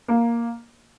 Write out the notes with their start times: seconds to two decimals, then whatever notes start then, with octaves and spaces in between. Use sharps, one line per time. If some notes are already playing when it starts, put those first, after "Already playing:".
0.08 A#3